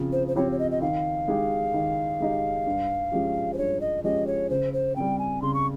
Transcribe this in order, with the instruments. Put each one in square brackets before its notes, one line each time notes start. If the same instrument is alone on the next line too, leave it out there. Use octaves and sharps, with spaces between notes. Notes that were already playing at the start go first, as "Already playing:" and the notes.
Already playing: [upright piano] C#3 F3 C4
[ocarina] C5
C5
[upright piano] F3 C4 G4 [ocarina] C#5
[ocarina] C#5
D#5
D#5
[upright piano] D#3 [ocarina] F5
[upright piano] G#3 D#4 G4
D#3
G#3 D#4 G4
G2
F3 G#3 C#4 G4
[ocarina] C5
[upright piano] G2 [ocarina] C#5
[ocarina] D#5
[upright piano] F3 G#3 C#4 G4 [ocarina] D#5
[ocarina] C#5
[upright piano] C#3 [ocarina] C5
[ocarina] C5
[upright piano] G3 C4 [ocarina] G5
[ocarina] G#5
[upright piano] C#3 [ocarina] C6
[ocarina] C#6